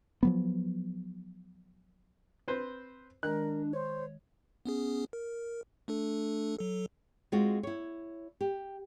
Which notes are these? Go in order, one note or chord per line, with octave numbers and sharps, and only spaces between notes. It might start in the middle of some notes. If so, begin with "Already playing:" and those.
F3 F#3 B3
C4 B4 C5
D#3 G#3 D4 A#4 F#6
C5 C#5
B3 C#4 G#4
A#4
A3 D4 A4
F#3 A4
G#3 C4 F4 F#4
E4 C#5
G4